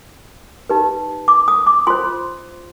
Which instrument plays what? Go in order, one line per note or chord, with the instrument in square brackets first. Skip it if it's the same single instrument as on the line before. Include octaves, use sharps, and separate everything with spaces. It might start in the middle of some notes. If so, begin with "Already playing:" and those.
[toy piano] D#4 G4 B4
D6
D#6
D6
F4 C5 C6